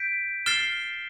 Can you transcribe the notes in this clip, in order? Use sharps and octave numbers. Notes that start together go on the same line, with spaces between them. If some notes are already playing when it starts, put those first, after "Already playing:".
Already playing: G6 B6 D7
F6 A6 C7 E7 G7